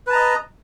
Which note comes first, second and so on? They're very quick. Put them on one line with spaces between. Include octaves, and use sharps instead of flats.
B4 A5 A#5 D#5